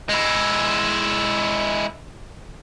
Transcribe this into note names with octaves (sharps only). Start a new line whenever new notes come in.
G#3 E4